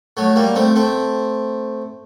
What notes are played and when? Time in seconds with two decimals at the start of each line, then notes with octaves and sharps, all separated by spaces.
0.17 F#3 A3
0.36 G3 A#3
0.56 A3 C4
0.76 A3 C4